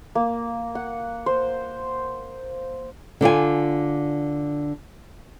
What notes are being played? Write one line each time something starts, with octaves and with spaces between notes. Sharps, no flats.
A#3
F#5
C5
D3 D4 F4 G#5